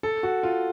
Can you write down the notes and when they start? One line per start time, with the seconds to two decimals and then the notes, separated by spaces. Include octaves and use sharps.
0.03 A4
0.23 F#4
0.43 F4